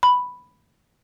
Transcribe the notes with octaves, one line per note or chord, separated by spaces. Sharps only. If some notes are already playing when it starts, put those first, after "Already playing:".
B5